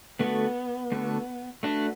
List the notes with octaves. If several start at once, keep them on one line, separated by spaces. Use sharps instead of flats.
D3 A3 B3 F#4 A4
D3 A3 F#4 A4
A3 D4 F#4 B4